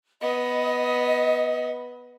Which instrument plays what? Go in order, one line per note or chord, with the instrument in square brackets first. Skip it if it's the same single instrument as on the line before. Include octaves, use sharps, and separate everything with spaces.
[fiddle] B3 [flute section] D#5